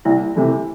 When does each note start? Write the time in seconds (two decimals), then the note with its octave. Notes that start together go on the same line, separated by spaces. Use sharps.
0.05 C2 E4
0.36 C3 E3 A3